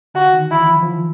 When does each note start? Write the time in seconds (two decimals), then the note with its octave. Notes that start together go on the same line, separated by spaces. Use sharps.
0.14 D3 F#4
0.33 D#3
0.50 E3 E4
0.69 F3
0.82 F3
0.87 E3